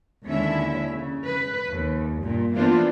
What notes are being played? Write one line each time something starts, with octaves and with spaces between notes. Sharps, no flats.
D#2 D3 G#3 C#4 E4 E5
C#3
B4
D#2
G2 A#2
E3 A#3 B3 D4 F4 C5